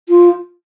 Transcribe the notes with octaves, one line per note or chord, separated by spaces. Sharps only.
F4